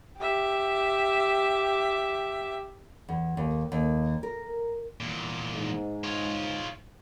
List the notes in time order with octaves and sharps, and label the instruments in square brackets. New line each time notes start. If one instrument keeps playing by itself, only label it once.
[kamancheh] G4 E5
[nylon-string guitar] E2
D#2
D#2
A#4
[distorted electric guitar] E2 A#2
[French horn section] G#2
[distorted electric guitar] F4 C#5